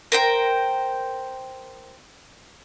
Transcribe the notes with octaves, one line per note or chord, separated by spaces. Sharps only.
A#4 C5 G5